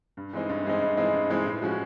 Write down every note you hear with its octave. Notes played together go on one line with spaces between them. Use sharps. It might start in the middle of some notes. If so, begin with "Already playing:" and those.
G2
E3 G#3 C4 D#4
G2
E3 G#3 C4 D#4
G2
E3 G#3 C4 D#4
G2
E3 G#3 C4 D#4
A2
F3 G#3 C#4 F#4